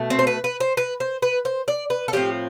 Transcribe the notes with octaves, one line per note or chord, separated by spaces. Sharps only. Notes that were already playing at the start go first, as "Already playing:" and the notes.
Already playing: B2 A3
C4
C5
B4
B4
C5
B4
C5
B4
C5
D5
B4
A4
A2 F3 C4 G4